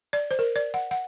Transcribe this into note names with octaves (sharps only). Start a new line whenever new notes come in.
D5
C5
A#4
D5
F#5
F#5